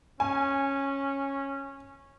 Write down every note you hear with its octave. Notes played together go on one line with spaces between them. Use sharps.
C#4 G#5